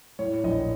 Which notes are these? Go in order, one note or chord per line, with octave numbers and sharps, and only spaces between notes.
A2 C#5
A#1 D#5